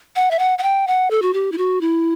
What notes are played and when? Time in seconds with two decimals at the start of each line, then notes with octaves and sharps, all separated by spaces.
0.16 F#5
0.31 E5
0.39 F#5
0.58 F#5
0.63 G5
0.87 F#5
1.11 A4
1.22 F#4
1.34 G4
1.52 E4
1.58 F#4
1.81 E4